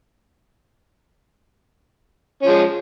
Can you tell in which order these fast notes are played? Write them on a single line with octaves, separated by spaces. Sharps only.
C#4 F3 G#3